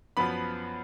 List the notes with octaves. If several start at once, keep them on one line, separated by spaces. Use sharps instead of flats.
F#2 F3 B3 B5